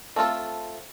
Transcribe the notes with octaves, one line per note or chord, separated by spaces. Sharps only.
A3 C4 F4 A4